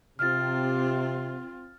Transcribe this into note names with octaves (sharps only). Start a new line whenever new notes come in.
C3 C4 F4 F6 A6